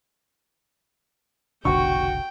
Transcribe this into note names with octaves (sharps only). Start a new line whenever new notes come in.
F1 B1 D3 F#4 G5 C#6